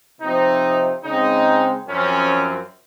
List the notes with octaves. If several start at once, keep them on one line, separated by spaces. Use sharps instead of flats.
C3 F3 C4 D#4
C#3 G#3 C4 D#4
F#2 F3 C4 C#4